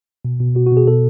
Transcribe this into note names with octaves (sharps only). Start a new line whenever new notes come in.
B2
B2
B2 F#4
F#4
B2
G#4
B2 A4